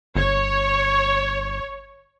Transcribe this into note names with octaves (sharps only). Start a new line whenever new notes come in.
G1 C#5